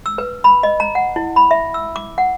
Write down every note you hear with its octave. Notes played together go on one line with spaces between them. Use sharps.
E6
B4
B5
D#5
A#5
F#5
E4
B5
E5
E6
D6
F#5